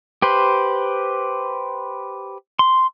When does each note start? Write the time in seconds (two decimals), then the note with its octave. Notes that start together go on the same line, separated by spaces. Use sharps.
0.22 G4 B4 C5
2.59 C6